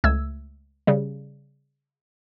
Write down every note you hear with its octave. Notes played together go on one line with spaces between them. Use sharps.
C#2 A3 E6 G#6
C#3 G3